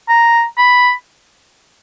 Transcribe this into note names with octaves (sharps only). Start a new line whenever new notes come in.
A#5
B5